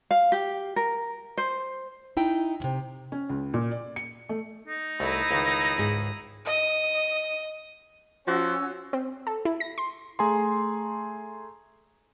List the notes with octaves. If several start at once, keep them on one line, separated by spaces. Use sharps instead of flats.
F5
G4
A#4
C5
D#4 E4 G5
E2 C3
C#4
C#2
A#2
D5
C#7
A3
D#4
C2 A3 E4 A#5 D#6
C#2 D#3
G#2 G#4
D#5
F3 C#4 F#4 F#5 E6
C4
A4
E4
A#6
C6
A3 G#4 G#5 A#5 C6